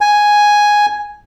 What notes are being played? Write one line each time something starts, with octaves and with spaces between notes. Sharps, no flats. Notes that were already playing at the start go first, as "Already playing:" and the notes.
G#5